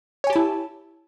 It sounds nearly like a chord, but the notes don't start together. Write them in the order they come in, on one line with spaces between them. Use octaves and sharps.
C#5 G#5 G4 A5 E4